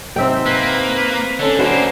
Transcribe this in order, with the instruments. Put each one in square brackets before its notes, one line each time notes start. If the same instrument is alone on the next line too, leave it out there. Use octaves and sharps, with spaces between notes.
[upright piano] G#2 C3 [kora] C4 E5 G5
[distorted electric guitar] A#3 [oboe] B4
[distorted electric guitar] D3 [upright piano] C#4 A4 C#5
[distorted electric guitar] D2 A#3 [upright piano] C#4 D4 F#4 [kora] B4 [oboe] C5